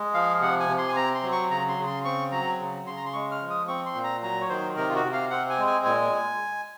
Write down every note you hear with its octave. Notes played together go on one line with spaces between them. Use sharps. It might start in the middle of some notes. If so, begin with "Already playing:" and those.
Already playing: G#3
F3 F5
C3 F#5
G#5
C3
C6
G#5
C4 A#5
C6
F#3
C#6
C#3 A#5
C6
C#3
C6
C4 C#6
F#3 A#5
C#3
C#3 C6
A#5
C6
G#3 C#6
F6
F3
D#6
C4 C#6
C6
A#2
A#5
F#3 A#5
C#5
D#3 C5
C3 A#4
F4
F#4
C3
F5
C4 F#5
G#5
G#3
G#5
A#2 G#5